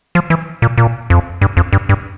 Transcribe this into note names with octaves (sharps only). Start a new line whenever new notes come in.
F3
E3
A#2
A#2
F2
G2
F2
G2
G2